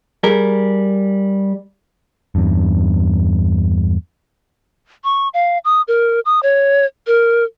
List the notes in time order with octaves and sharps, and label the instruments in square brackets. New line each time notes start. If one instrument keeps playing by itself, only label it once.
[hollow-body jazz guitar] G3 G#4 A#4
[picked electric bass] E2 G2
[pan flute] C#6
F5
D#6
A#4
D#6
C#5
A#4